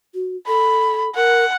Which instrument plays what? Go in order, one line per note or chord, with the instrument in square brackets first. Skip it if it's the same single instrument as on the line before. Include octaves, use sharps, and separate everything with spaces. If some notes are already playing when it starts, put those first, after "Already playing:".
[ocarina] F#4
[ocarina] A4 [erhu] B5
[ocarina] A#4 [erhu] F#5